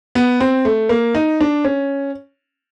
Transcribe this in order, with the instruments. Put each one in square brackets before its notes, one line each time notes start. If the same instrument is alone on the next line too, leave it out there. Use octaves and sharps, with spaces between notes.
[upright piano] B3
C4
A3
A#3
D#4
D4
C#4